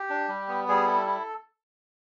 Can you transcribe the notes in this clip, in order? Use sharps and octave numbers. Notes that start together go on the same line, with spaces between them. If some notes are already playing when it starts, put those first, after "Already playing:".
Already playing: G4
D4
G3
B3
G3 G#4
E4 A4
E4